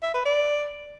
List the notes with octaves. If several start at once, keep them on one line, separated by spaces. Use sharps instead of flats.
E5
B4
D5